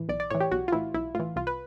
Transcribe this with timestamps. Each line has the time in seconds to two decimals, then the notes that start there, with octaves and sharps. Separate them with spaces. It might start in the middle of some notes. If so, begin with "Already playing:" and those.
Already playing: A2 E3
0.09 B1 D5
0.20 D5
0.30 A2 E3 C#5
0.40 G4
0.52 B1 F#4
0.68 F4
0.72 A2 E3 E4
0.94 B1 E4
1.15 A2 E3 F4
1.36 C2 F4
1.47 B4